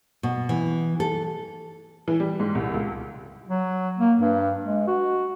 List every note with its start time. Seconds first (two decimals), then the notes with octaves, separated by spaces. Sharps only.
0.23 B2
0.49 E3
1.00 A4
2.08 E3
2.20 G3
2.40 G#2
2.55 C2
2.74 C#2
3.48 F#3
3.99 A#3
4.20 G2
4.63 G#3
4.87 F#4